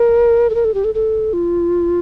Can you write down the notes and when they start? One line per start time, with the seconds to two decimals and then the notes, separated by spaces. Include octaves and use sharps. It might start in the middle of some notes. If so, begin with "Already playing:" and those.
Already playing: A#4
0.50 A4
0.55 A#4
0.64 A4
0.74 G4
0.84 A4
0.94 A4
1.33 F4